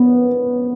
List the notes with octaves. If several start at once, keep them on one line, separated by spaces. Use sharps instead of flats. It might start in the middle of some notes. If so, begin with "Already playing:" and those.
Already playing: B3